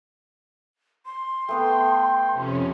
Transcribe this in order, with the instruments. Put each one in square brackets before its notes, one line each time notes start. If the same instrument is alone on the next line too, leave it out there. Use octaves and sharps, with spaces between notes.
[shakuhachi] C6
[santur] A3 B3 A4 [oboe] G5
[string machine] F2 C3 C#4